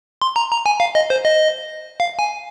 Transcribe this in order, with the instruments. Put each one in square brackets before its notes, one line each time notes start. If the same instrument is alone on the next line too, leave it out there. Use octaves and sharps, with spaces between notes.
[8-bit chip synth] C6
A#5
A#5
G#5
F5
D#5
C5
D#5
F5
G#5